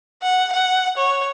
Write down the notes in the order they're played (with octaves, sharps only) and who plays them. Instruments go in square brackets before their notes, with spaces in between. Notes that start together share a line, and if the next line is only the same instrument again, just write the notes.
[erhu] F#5
F#5
C#5